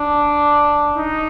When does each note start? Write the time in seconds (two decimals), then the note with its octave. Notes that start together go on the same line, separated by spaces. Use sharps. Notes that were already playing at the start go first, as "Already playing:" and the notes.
Already playing: D4
0.96 D#4